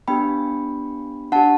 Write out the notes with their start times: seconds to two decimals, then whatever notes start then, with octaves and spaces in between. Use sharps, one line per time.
0.08 B3 D4 G4 G5 B5
1.32 D4 G4 F#5 A5